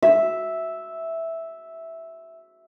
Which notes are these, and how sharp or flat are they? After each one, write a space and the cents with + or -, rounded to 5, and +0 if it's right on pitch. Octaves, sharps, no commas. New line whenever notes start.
E5 -5